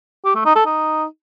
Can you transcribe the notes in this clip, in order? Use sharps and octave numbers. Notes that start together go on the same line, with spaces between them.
G4
A3
D#4
A4
D#4